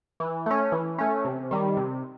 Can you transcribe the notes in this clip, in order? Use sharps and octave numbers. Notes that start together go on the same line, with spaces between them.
E3
A3 C#4
E3
A3 C#4
C3
D#3 G3
C3